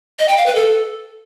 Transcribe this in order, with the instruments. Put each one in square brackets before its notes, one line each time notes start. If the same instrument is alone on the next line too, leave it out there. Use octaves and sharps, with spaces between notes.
[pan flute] D#5
G5
F5
B4
A4